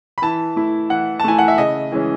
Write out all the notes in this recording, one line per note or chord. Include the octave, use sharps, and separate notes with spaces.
B5
E3 A5
A3 E4
E3 F#5
A5
A3 E4 G#5
F#5
E5
C#3 D#5
E3 G#3 C#4